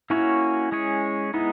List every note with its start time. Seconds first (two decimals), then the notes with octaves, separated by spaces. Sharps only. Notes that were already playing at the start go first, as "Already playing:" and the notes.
0.10 A#3 C#4 E4 F#4 C#5
0.72 G#3 C#4 G#4 C#5
1.34 G#3 B3 D#4 E4